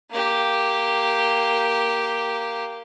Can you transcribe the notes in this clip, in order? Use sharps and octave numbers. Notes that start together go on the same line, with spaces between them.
A#3 G4